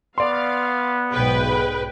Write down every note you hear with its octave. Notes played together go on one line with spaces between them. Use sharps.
B3 D5 F5 C6
B1 G#2 B2 G#4 B4 G5